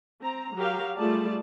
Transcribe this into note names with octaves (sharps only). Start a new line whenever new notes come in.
C4 A#5
F#3 G4 A#4 F5
G3 A3 F4 G#4 D5 A5